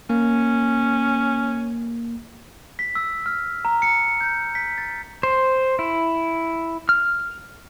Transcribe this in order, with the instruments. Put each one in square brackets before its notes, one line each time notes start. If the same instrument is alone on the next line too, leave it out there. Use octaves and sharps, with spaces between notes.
[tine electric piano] A#3 [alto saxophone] C#4
[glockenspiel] B6
E6
F6
A#5
C#7
G6
B6
A6
[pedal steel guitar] C5
E4
F6